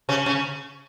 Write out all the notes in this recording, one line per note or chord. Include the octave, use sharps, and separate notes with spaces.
C#3 C#4
C#3 C#4